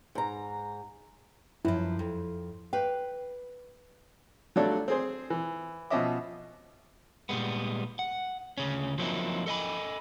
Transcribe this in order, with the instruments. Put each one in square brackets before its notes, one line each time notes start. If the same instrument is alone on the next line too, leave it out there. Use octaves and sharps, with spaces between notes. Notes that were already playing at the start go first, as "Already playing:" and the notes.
[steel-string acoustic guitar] G#2 A#5
[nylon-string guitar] F#2 F3 [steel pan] E4
[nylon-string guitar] F2
[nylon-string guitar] B4 F5 [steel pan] G5
[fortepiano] F#3 G3 A3 D4 F4 A4
C4 G#4 C5
E3
B2 F3 C#4 D#5 E5 D6
[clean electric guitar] A#2 G3 G#3 B3
F#5
D2 C#3 C#4
F3 F#3 A#3 C4 D#4 E4
A4 D#5 G#5 B5